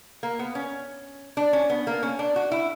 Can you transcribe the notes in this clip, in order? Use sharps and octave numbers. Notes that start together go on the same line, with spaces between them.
A#3
B3
C#4
D4
C#4
B3
A#3
C#4
D4
F#4
E4